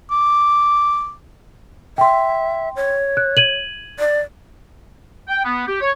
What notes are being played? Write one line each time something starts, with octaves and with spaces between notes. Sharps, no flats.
D6
E5 G5 C6
C#5
F#6
G#6 D#7 F#7
D5
G5
B3
G4
C#5